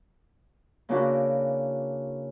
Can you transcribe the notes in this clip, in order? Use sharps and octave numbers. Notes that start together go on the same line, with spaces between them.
C#3 A#3 D4 E4 F#4